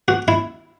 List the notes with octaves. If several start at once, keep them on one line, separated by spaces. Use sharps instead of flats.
F#4
E4